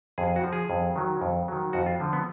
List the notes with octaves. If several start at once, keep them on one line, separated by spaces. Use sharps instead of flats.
F2 G#4
F#4
F3
G#4
F2
D#3 F#3
F2
D#3 F#3
F2 F#4
F4
D3 F3
B3